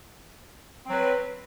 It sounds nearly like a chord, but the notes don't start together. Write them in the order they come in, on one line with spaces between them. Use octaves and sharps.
C4 F#3 B4